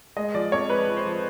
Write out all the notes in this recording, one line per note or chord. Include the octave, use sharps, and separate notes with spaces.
G#3 D#5
F3 D5
F2 C#5
G#3 B4
F3
C5
F3